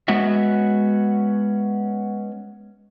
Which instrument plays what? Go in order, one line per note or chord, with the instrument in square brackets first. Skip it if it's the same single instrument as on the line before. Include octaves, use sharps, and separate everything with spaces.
[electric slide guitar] G#3 B3 C#4 F#4 E5